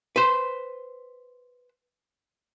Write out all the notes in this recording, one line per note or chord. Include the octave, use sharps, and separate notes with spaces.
B4 C5